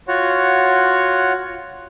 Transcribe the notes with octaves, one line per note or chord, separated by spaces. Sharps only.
F4 F#4 C#5 F#5